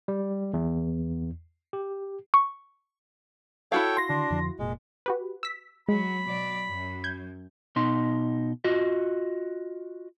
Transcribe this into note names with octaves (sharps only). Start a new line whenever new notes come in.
G3
E2
G4
C#6
E4 F#4 A4 C#5 F5 G5
C6 A#6
D3 D#3 D4
F2 D3 F3
F1 A#2 G#3
F#4 G4 B4
E6 B6
F#3 G#3 B5
B2 F#3 D5
F#2
G6 G#6
B2 D#4 C6
F4 F#4 D#5